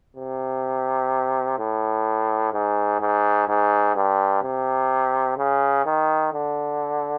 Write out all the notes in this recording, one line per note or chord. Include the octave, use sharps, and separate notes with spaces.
C3
A2
G#2
G#2
G#2
G2
C3
C#3
D#3
D3